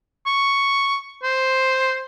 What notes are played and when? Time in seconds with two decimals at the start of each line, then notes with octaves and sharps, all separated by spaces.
0.26 C#6
1.23 C5